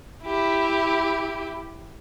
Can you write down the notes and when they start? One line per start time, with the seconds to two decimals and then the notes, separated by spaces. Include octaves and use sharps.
0.24 E4 G4